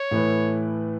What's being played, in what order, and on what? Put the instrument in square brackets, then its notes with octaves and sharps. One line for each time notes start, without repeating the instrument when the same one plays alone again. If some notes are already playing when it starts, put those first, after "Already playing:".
Already playing: [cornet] C#5
[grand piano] A2 E3 A3 E4 B4